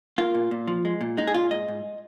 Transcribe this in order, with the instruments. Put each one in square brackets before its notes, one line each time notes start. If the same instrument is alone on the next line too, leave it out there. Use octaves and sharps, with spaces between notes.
[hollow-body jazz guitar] A#3 F4
A#2
A#2
F3
G#3
A#2
G#3 D#4
G#4
A#2 F4
G#2 D#5
G#2